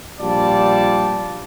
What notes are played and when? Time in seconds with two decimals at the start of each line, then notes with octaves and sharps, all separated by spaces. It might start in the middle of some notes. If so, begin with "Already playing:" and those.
0.21 A#1 G3 F4 D5 A5